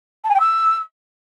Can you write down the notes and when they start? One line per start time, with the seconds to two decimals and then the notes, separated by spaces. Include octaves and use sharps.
0.24 A5
0.29 G#5
0.34 G5
0.39 E6